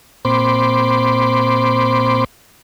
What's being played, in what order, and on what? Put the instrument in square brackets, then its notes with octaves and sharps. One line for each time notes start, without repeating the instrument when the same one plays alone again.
[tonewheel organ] A#2 C4 C5 B5 C6 D6